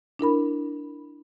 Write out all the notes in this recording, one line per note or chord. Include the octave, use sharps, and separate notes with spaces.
D4 E4 A#4 B5